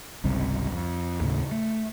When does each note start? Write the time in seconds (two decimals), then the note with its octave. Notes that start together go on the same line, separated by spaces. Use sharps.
0.24 G#1 C#2 C3 G3
0.72 F2
1.21 D#2 A2 C#3
1.52 A3